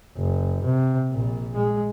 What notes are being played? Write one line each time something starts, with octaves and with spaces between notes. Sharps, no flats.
F#1
C3
A#1 A#2
G#3